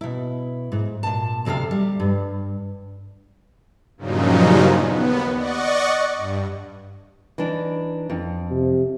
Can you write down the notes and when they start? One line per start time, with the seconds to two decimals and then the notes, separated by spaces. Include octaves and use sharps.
0.01 B2 E4
0.72 G#2
1.03 A#2 A5
1.45 D2 C3 G#4 A4 F5
1.71 G3
2.00 G2
3.97 G2 A#2 C#3 F3 F#3 D#4
4.80 D#2 B3
5.34 D5 D#5 F#5 C#6
6.16 G2
7.38 E3 D4 D#4
8.10 F2
8.51 C3